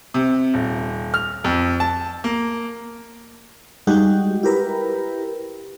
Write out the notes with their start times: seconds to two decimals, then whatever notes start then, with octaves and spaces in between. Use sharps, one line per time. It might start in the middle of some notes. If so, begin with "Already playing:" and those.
0.14 C3
0.54 D#1
1.14 F6
1.44 F2
1.80 A5
2.24 A#3
3.87 G3 G#3 D#4 F#4 G4
4.43 E4 G4 A#4 B4